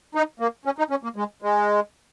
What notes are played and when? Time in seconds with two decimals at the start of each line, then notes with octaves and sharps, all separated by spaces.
0.15 D#4
0.40 A#3
0.65 C#4
0.78 D#4
0.90 C#4
1.03 A#3
1.16 G#3
1.42 G#3